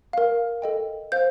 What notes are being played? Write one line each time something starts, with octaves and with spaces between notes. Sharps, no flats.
A#4 F5
A4 D#5 G5
C5 F5 G6